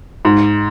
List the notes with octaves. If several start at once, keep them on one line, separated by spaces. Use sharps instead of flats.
G#2